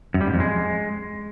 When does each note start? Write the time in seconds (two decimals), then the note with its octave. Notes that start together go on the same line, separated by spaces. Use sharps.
0.14 F#2
0.21 G3
0.27 G#2
0.34 F2
0.40 G#3